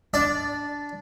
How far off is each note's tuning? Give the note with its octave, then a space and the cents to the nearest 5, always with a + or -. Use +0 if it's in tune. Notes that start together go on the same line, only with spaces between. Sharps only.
D4 -10 D5 +0